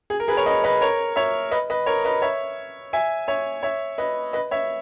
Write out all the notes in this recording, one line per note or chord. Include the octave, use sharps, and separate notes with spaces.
G#4
A#4
G#4 B4
A#4 C#5
B4 D#5
B4 D#5
A#4 C#5
C#5 E5
B4 D#5
B4 D#5
A#4 C#5
B4 D#5
C#5 E5
E5 G#5
C#5 E5
C#5 E5
B4 D#5
B4 D#5
C#5 E5